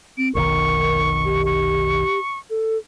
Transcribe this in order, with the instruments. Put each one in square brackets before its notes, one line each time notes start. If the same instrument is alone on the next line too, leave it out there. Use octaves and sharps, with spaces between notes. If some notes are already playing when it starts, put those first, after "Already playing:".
[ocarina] C4 [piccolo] D7
[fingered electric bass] F1 B1 D#3 [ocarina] A#4 [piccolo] C#6
[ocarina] G4
[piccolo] C#6
[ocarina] A4